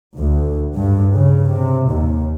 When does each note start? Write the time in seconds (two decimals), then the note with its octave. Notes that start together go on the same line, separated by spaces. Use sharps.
0.17 D2
0.76 G2
1.14 C#3
1.50 C3
1.90 D#2